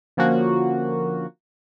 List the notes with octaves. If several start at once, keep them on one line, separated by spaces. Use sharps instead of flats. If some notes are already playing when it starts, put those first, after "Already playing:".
D3 F3 A#3 C#4 F#4